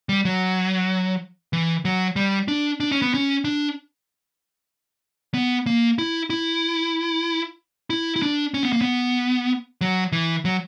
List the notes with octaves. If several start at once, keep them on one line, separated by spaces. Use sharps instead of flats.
G3
F#3
E3
F#3
G3
D4
D4
C#4
B3
C#4
D4
B3
A#3
E4
E4
E4
E4
D4
C#4
B3
A#3
B3
F#3
E3
F#3